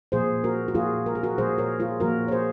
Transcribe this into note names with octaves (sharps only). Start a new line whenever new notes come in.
A#2 F3 A#3 G#4 C5
F#4 A#4
F#4
A#2 F3 A#3 F4 G#4
A#4
G#4
F#4 A#4
A#2 F3 A#3 G#4 C5
A#4 C#5
F4 G#4
A#2 F3 A#3 F#4 A#4
C#5
G#4 C5